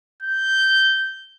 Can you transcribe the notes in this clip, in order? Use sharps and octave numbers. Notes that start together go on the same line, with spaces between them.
G6